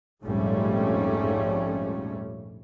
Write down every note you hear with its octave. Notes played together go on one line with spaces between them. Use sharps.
A#1 F2 G#2 G3 A3 C#4